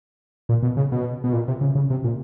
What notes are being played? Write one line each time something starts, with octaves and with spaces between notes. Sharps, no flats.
A#2
B2
C#3
B2
B2
A#2
C3
C#3
C#3
C3
A#2